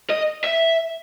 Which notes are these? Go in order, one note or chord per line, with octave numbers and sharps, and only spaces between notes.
D#5
E5